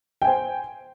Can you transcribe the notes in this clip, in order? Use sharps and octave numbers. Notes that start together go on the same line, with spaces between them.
C5 G5 G#5